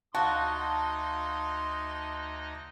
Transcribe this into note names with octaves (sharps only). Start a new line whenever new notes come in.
D2 D#4 F#4 D#5 F5 A5 C6 D#6